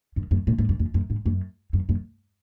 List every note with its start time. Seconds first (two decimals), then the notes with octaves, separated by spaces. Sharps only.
0.16 F#2
0.31 F#2
0.47 A#2
0.58 G#2
0.69 F#2
0.79 F2
0.94 F#2
1.10 G#2
1.26 F#2
1.73 F#2
1.89 F#2